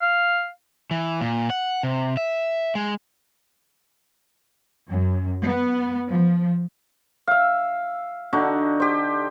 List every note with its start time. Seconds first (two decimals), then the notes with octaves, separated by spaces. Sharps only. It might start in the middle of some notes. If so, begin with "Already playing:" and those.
0.02 F5
0.91 E3
1.21 A#2
1.50 F#5
1.83 C3
2.17 E5
2.75 G#3
4.88 F#2
5.44 B3
6.11 F3
7.28 E5 F5
8.33 D3 D4 D#4 F#4
8.80 G4 C5